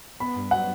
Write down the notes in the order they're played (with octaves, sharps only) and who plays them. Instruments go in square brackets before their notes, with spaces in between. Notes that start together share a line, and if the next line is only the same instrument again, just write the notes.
[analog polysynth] B3 [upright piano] B5
[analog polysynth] G2
[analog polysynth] F#3 [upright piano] F#5